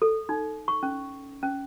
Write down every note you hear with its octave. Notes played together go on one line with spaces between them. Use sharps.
A4
D#4
C#6
C#4
C#4